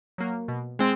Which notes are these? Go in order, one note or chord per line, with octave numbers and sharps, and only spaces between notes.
F#3 A#3
B2
G#3 C4